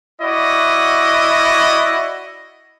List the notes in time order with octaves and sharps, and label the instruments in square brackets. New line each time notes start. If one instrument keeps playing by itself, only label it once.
[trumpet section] E4 F#4 D5 D#5